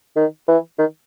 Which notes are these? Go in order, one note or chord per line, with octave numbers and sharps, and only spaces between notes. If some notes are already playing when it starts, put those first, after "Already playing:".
D#3
E3
D#3